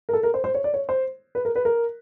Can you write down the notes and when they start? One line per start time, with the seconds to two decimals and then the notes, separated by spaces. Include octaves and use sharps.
0.09 A#4
0.13 A4
0.23 A#4
0.34 C5
0.44 C5
0.54 C#5
0.64 D5
0.74 C#5
0.89 C5
1.35 B4
1.45 A#4
1.56 B4
1.65 A#4